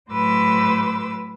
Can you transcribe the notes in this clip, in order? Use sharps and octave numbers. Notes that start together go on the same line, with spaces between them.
A2 F#3 B4 C5 D6 E6